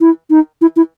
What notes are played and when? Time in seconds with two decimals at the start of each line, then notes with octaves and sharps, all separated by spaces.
0.01 E4
0.30 D#4
0.61 E4
0.76 E4